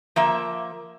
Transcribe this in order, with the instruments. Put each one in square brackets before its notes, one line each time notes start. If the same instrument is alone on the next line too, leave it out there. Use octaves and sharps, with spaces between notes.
[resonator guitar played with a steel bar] F3 A#3 E5